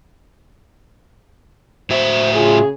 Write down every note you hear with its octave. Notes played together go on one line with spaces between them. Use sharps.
A2 F#4 C5 E5
C#3 F4 G#4